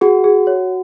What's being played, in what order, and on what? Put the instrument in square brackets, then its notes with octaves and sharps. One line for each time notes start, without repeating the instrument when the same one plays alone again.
[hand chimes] F#4 [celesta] G#4
[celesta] G#4
C#5